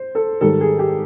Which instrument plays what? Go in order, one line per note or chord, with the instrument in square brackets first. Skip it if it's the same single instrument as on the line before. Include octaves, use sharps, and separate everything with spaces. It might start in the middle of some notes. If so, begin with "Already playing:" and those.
Already playing: [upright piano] C5
A4
G#2 D#3 G3 A4
G#4
G4